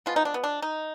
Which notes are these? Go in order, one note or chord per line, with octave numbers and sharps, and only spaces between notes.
F3 G#3 B3 F4
D#4
D4
B3
D4
D#4